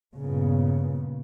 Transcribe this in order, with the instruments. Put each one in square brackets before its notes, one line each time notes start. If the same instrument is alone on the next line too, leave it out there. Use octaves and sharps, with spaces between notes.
[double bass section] G2 A#2 C#3 B3